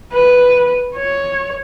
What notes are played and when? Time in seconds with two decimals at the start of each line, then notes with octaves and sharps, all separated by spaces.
0.13 B4
0.96 C#5